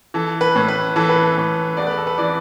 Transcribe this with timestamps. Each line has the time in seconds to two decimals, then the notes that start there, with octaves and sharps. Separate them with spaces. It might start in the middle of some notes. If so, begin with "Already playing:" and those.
0.14 E3 A4
0.41 B4
0.56 A2
0.68 B4
0.96 E3 A4
1.09 B4
1.23 A4
1.37 A2
1.77 E2 D5
1.87 B4
1.98 A4
2.07 B4
2.18 E3 D5